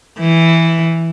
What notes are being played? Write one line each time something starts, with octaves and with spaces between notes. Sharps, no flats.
E3